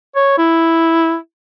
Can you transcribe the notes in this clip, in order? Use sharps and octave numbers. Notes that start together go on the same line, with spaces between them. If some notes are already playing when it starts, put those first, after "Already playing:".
C#5
E4